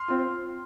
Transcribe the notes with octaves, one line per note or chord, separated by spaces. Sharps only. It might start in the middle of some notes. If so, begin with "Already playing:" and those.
Already playing: C6 F6
C4 F4